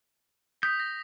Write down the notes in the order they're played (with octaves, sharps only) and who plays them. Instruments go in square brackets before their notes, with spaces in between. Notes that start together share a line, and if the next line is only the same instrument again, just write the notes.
[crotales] D#6 B6 [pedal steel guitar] G6
[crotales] A#6